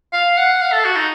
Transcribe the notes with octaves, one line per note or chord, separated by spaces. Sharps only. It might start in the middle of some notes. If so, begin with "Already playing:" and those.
F5
F#5
F5
A4
F#4
D#4